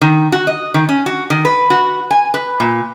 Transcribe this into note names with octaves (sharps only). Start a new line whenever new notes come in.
D#3
F#4
D#5
D#3
C#4
F#4
D#3
B4
F#4
G#5
B4
A#2